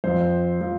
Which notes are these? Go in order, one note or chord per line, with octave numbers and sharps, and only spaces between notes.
F2 F3 C5
F3